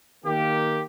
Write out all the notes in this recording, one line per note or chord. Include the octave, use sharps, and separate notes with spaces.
D#3 A#3 G4